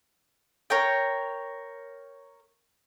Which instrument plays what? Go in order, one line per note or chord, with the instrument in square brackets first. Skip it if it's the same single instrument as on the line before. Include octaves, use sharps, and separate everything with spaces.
[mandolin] A#4 C#5 G5